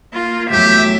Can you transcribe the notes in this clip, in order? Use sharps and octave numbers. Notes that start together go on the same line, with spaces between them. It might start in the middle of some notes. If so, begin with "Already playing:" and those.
A#3 F4
E2 F#3 A3 G4 E5